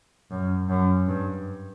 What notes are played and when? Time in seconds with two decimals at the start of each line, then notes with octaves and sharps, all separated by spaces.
0.31 F#2
0.69 F#2
1.07 G2